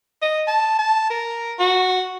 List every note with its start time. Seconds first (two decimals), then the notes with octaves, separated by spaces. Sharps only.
0.22 D#5
0.47 A5
0.79 A5
1.10 A#4
1.59 F#4